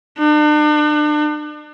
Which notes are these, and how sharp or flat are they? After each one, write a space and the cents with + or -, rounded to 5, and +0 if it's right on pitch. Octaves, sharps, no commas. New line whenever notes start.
D4 +40